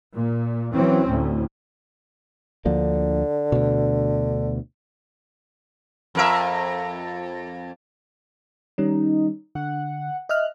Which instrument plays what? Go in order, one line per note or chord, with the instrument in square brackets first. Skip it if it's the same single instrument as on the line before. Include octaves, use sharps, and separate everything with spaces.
[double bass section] A#2
E3 F#3 C4 C#4
D2 A2
[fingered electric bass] D2 F3 A#3 [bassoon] D3
[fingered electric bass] D2 B2
[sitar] F2 A#4 E5
[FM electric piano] D#3 G3 C#4 [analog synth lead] D#4
[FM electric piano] D3 [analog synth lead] F#5
[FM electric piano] D#5 E5 F6 [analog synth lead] F#6